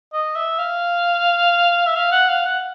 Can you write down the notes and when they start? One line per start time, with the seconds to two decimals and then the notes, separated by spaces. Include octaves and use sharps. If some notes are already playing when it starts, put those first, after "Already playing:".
0.13 D#5
0.36 E5
0.59 F5
1.87 E5
1.95 F5
2.12 F#5
2.29 F5
2.46 F#5